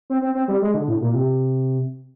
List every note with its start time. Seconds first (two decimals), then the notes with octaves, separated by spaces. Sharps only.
0.10 C4
0.22 C4
0.35 C4
0.48 G3
0.62 G#3
0.74 D3
0.87 A2
1.01 A#2
1.13 C3